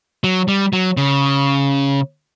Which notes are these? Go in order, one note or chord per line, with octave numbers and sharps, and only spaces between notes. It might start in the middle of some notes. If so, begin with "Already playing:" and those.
F#3
G3
F#3
C#3